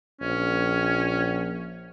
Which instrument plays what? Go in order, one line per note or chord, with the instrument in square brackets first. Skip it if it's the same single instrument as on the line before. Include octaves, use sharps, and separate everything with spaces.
[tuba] A#1 [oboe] C#4